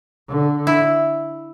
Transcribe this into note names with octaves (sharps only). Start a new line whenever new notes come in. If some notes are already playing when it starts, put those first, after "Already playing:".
D3
E4